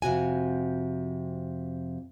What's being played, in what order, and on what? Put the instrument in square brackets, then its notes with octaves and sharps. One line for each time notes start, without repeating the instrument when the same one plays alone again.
[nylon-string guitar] F2 C3 F#4 G#5